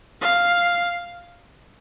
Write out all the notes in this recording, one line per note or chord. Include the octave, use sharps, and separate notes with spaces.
F5